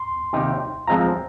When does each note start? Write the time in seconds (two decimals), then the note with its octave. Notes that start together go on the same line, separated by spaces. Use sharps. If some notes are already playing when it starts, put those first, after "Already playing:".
Already playing: C6
0.33 C3 D#3 A#3 D#4 G4
0.88 F3 G#3 C4 F4 A#5